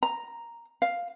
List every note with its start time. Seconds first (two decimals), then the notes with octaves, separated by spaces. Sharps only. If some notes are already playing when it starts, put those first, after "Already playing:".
0.03 A#5
0.82 F5